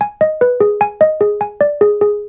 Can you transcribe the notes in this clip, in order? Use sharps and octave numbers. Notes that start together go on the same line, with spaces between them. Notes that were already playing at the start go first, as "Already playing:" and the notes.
G#5
D#5
B4
G#4
G#5
D#5
G#4
G#5
D5
G#4
G#4